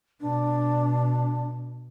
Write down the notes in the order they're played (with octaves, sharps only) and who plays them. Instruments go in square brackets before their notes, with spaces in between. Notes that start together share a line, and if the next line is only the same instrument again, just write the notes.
[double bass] B2 [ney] D4